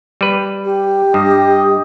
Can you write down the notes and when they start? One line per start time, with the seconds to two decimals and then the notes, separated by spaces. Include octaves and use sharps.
0.21 G3 B4
0.64 G4
1.14 G2 D#5